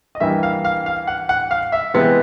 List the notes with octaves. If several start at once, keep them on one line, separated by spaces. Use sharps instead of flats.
D#5
G2 E3 G3 A#3 E5
F5
F5
F5
F#5
F#5
F5
E5
C3 E3 G#3 B3